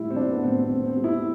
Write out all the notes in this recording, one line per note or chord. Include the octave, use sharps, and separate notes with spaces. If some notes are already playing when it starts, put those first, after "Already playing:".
Already playing: A2 G3 E4
C4
G3 D4
B3
A2 C4
C4
A2
C4
G3
E4